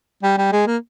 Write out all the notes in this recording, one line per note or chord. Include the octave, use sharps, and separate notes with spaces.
G3
G3
G#3
A#3